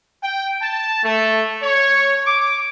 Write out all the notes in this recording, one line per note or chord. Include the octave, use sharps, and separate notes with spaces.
G5
A5
A3
C#5
D6